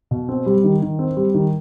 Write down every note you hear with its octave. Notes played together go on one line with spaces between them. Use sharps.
B2
C4
G3
D#3
D#3
C4
G3
D#3